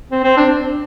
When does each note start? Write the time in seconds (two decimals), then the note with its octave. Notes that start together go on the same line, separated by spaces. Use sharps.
0.11 C4
0.24 C4
0.37 D4